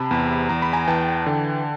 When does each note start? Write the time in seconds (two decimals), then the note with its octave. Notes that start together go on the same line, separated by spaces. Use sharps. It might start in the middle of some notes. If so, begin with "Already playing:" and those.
Already playing: C3 A5 B5
0.11 E2
0.49 E2 A#5
0.62 B5
0.73 G#5 A#5
0.88 E3 G5 A5
1.26 D3